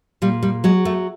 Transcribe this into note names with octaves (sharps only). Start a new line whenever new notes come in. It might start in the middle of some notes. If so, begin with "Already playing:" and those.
A#2 G3
G3
F#3 G#3
A3